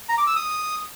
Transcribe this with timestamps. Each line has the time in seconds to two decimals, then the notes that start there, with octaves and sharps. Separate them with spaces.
0.09 A#5
0.18 D6
0.27 E6
0.36 D#6